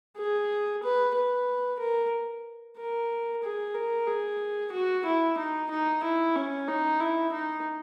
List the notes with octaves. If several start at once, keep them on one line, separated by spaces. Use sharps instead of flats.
G#4
B4
B4
A#4
A#4
G#4
A#4
G#4
F#4
E4
D#4
D#4
E4
C#4
D#4
E4
D#4